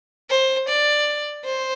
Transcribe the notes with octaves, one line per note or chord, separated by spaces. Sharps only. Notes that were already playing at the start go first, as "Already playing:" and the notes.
C5
D5
C5